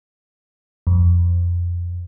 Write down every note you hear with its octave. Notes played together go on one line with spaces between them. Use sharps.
F2